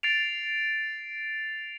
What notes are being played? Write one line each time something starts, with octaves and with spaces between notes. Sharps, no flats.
A6 C7 D7 F7